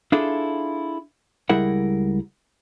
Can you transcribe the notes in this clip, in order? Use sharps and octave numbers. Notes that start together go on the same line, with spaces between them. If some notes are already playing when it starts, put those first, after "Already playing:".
D4 E4 F4 G#4 A4
C#2 G3 E4 G#4 A#4 F#5